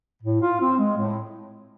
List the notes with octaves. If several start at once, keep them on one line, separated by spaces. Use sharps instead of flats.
A2
F4
C4
G#3
A2